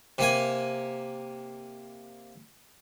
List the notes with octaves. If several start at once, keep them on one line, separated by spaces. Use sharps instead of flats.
C3 A#3 G#5